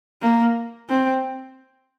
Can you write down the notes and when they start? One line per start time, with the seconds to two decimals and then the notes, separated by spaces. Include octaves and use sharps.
0.22 A#3
0.89 C4